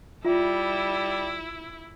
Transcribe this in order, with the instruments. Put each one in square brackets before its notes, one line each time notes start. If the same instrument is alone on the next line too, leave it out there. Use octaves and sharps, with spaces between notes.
[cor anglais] G3 [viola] E4 [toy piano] F4 E5